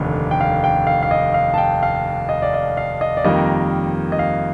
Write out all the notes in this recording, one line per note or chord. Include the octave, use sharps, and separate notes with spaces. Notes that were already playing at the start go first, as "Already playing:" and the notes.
Already playing: F1 D#2 D3
G5
F5
G5
F5
F5
D#5
F5
A5
G5
F5
D#5
D5
D#5
F5
D#5
D5
F2 D#3 G3 A#3 D#5
D#5
F5